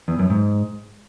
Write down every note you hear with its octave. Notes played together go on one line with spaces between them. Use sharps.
E2
F#2
G#2